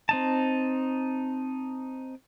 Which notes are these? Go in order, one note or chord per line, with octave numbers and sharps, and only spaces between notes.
C4 D#4 A5